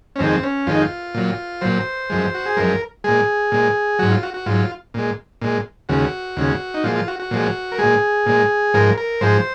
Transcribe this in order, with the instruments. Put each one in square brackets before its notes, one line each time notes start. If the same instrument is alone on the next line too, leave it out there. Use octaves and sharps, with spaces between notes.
[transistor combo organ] C#4
F2 D#3 G#3 C4
C#4
F2 D#3 G#3 F4
D#4
F4
A#2 F#3
A#2 F#3 C5
F#2 F3 G#3
F#4
G#4
F#2 F3 G#3 A#4
A#2 G#3 G#4
A#2 G#3
G#2 F#3 F#4
F4
F#4
F#4
G#2 F#3 F4
A#2 G#3
A#2 G#3
D#2 C#3 G#3 F#4
D#2 C#3 G#3
D#4
A#2 F3 G#3 F4
F4
F#4
F#4
A#2 F3 G#3
A#4
A#2 G#3 G#4
A#2 G#3
G#2 F3 G#3 A#4
A#4
G#2 F3 G#3 C5